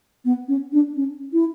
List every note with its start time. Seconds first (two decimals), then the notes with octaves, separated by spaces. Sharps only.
0.25 B3
0.48 C#4
0.73 D4
0.96 C#4
1.33 E4